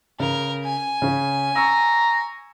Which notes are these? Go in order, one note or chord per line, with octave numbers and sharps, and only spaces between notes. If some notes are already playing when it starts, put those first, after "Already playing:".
C#3 A#4
G#5
C#3 C#4
A#5 C#6 E6